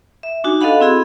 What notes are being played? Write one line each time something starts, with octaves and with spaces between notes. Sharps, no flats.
E5
D4 D#4 F#4 G#5
F#4 A4 D#5 F5 F#5 B5
C4 E4 G#4 B5